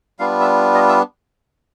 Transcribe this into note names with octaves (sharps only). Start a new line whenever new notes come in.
G3 B3 D4 F4 F5
E5
D#5
E5